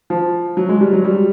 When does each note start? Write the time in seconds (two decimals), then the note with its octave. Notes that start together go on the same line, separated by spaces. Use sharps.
0.10 F3
0.57 F#3
0.69 G#3
0.81 G3
0.93 F#3
1.05 G3